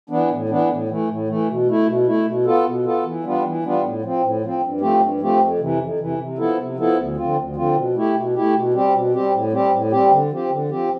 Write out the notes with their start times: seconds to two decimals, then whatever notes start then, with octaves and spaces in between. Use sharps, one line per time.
0.10 E3 B3 D4
0.30 A2
0.49 E3 B3 D4
0.70 A2
0.89 E3 A3
1.09 A2
1.28 E3 A3
1.48 B2
1.67 A3 E4
1.87 B2
2.06 A3 E4
2.26 B2
2.45 B3 F4 A4
2.65 B2
2.84 B3 F4 A4
3.05 E3
3.24 G3 B3 D4 F4
3.44 E3
3.64 G3 B3 D4 F4
3.82 A2
4.02 F3 C4
4.23 A2
4.42 F3 C4
4.62 G2
4.81 F3 A3 C4 G4
5.01 G2
5.20 F3 A3 C4 G4
5.40 F2
5.59 C3 E3
5.80 F2
5.99 C3 E3
6.19 C3
6.38 F3 B3 E4 A4
6.58 C3
6.77 F3 B3 E4 A4
6.97 D2
7.16 D3 F3 C4 F4
7.36 D2
7.56 D3 F3 C4 F4
7.75 B2
7.95 A3 E4 G4
8.15 B2
8.34 A3 E4 G4
8.54 B2
8.74 G3 C4 G4
8.93 B2
9.13 G3 C4 G4
9.33 A2
9.52 G3 C4 G4
9.72 A2
9.91 G3 C4 G4
10.10 D3
10.31 F3 C4 G4
10.50 D3
10.69 F3 C4 G4